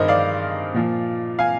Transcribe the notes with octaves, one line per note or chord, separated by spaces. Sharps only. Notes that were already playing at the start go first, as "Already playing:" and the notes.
Already playing: G2 D#3 G#4 A#4 C5 D#5
D5 F5
A#2 F3
F5 G#5